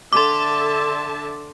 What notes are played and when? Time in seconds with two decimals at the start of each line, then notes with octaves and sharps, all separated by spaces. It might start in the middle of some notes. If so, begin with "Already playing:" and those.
0.13 D3 E5 A5 C6 D6